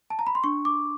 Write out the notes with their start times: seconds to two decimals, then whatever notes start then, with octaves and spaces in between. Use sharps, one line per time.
0.10 A5
0.19 A#5
0.27 B5
0.35 C6
0.44 D4 C#6
0.65 D6